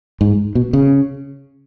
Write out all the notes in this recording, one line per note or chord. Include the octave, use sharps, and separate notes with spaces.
G#2
B2
C#3